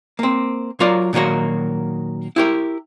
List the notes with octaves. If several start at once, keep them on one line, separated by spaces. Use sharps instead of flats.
A#3 C4
F#3 F4 A#4 D5
A#2 D#3 F#3 A#3 F#4
E4 G4 A#4